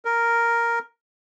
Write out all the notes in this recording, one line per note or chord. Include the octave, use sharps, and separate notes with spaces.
A#4